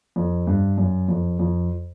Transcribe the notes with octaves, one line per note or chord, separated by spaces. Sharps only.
F2
G2
F#2
F2
F2